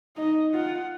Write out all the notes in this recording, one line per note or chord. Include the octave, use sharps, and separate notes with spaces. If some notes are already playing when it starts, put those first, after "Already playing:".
D#4 D#5
F4 F#5